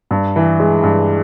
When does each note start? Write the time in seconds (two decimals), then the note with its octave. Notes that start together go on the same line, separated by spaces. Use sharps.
0.11 G2
0.36 E3
0.60 G#3
0.83 G2